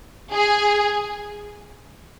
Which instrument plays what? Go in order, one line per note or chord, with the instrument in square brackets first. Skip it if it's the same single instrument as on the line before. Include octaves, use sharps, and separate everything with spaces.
[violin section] G#4